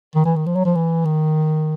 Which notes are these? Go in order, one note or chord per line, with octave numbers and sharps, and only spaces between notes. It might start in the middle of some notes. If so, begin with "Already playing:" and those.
D#3
E3
D#3
F3
F#3
F3
E3
D#3